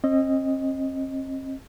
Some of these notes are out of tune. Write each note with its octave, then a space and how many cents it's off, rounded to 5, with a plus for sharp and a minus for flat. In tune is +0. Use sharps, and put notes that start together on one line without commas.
C4 +40 D#5 +0